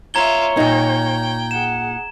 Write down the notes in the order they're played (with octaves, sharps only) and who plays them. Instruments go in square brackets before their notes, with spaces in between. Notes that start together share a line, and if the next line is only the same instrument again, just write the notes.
[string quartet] F4 E5 [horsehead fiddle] C#5 [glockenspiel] A#5 G#6 G7
[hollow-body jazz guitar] A#2 D#4 [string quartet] G5
[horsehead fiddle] G#4 F#5 [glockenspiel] E7